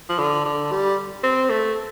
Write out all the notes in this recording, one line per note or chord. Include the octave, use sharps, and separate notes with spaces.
F3
D3
D3
G3
C4
A3